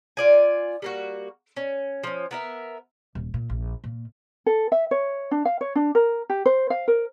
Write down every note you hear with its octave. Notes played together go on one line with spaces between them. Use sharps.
F4 D5 G#5
G3 A#3 F#4
C#4
F3 C#4
B3 A#4 E5
D#1
A#2
A#1
A#2
A4
E5
C#5
D4
F5
C#5
D4
A#4
G4
C5
F5
A#4